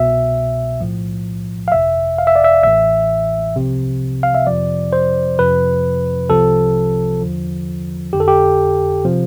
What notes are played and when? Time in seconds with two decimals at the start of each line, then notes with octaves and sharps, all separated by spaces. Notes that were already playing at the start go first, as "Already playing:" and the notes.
Already playing: C2 B2 E5
0.81 B1 A2 F3
1.68 F5
1.72 G1 F2 C3 E5
2.18 F5
2.27 E5
2.36 D5
2.44 E5
2.63 A1 A2 E3 E5
3.55 C2 C3 F3
4.23 F5
4.35 E5
4.47 F2 C3 F3 D5
4.93 C5
5.38 F2 C3 F3 B4
6.30 C2 C3 F3 A4
7.21 E2 D3 F3
8.13 G1 F2 D3 G4
8.20 A4
8.28 G4
9.05 C3 F3